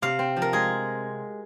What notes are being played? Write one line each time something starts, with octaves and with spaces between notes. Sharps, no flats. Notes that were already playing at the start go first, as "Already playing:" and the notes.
C3 F5
C4
F3
A#4
G#3 G#4